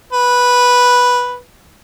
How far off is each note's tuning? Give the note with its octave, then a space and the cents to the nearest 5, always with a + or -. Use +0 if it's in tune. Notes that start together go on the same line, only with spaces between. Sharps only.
B4 -5